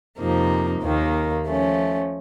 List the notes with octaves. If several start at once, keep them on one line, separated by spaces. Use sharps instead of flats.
F2 C3 F3 A#3 D#4
D#2 D#3 A#3
F3 A3 C#4